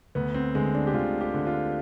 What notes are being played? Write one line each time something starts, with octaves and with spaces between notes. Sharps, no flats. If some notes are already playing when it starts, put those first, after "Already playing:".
D2 B3
C4
D3 G#3
D4
G4
D2 F4
G4
D3
F4